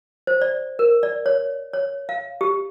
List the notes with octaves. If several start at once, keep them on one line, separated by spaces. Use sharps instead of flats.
C5
D5
A#4
D5
C#5
C#5
F5
G4